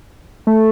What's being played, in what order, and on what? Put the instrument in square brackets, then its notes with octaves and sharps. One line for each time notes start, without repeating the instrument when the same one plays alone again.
[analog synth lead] A3